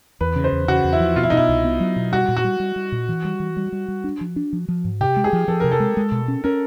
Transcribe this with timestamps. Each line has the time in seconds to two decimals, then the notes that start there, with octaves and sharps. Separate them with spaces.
0.21 E2 B4
0.36 C#3
0.44 C5
0.52 E2
0.68 C#3 F#4
0.84 E2
0.93 E4
1.00 F3
1.16 B2 F4
1.23 E4
1.30 B2 D#4
1.37 E4
1.48 C2
1.64 B3
1.80 F#3
1.96 B2
2.12 G3 F#4
2.29 A#2
2.37 F#4
2.44 G3
2.60 G3
2.76 G3
2.92 A#2
3.09 E3
3.25 G3
3.40 E3
3.57 G3
3.72 G3
3.88 G3
4.04 D4
4.21 F3
4.36 D4
4.53 F3
4.68 F3
4.85 G#2
5.00 C3 G4
5.17 G#3
5.24 G#4
5.33 F3
5.48 F3 A4
5.60 C3 A#4
5.72 A4
5.80 G#3
5.97 G#3
6.12 B2
6.28 C#4
6.44 C#4 A#4